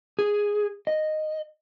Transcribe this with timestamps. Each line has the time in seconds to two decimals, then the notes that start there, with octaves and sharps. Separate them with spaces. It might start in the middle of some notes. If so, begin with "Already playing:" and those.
0.19 G#4
0.87 D#5